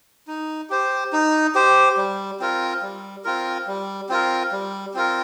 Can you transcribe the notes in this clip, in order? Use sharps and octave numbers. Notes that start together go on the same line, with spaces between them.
D#4
G4 C5
D#4
G4 C5
G3
C4 F4 A#4
G3
C4 F4 A#4
G3
C4 F4 A#4
G3
C4 F4 A#4